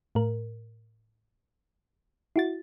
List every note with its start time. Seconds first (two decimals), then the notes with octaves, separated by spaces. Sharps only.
0.15 A2 A#4
2.36 E4 F#4 A6